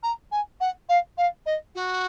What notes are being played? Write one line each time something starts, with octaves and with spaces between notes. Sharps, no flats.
A#5
G#5
F#5
F5
F5
D#5
F#4